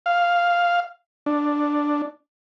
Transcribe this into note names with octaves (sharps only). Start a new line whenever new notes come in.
F5
D4